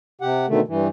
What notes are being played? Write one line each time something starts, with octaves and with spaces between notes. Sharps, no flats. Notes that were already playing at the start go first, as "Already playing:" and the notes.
C3 G4 F#5
B2 D3 D#3 A3
G2 E3